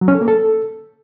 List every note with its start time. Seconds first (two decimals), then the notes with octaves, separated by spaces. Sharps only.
0.01 F#3
0.08 C#4
0.15 A4
0.21 A#3
0.28 A4